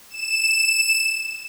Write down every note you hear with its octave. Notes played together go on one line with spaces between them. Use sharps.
E7